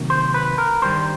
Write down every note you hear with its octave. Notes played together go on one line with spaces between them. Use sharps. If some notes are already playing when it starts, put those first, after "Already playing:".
Already playing: C3 D#3 F#3 A#3
C5
B4
A#4
G2 D#3 G3 C5